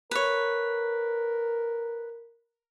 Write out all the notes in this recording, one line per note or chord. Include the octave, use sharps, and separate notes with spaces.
A#4 B4 C#5